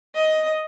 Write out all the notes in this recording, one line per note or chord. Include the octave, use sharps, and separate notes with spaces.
D#5